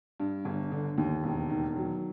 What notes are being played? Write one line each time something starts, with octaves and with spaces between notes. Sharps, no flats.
G2
G1
D3
D#2
E1
D#3
F#3